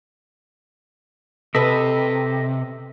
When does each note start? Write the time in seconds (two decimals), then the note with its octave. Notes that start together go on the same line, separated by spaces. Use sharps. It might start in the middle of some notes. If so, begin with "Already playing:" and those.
1.55 C3 A4 B4 D#5 E5